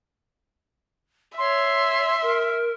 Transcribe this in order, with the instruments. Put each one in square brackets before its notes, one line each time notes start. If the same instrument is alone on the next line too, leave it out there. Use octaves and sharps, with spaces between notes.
[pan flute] C#5 [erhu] E5 [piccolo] C6
[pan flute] A#4